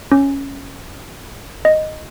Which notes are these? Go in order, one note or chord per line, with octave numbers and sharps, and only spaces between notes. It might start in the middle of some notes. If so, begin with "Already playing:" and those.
C#4
D#5